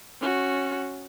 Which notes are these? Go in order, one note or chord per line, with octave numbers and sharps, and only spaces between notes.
C#4 F#4